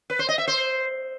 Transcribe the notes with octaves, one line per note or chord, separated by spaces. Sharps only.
B4
C5
D#5
E5
C5